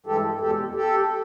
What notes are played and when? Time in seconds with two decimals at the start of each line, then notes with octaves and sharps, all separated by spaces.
0.06 G2 E3 G#3 G4 A4
0.40 E2 B2 G#3 G4 A4
0.75 G4 A4